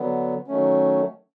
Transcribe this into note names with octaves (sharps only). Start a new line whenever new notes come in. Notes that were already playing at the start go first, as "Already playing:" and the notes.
Already playing: D3 F#3 B3
D#3 F#3 A3 C#4